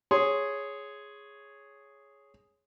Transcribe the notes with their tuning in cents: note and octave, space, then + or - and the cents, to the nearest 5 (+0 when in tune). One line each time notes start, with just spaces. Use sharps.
G#4 +0 C#5 +0 C6 +0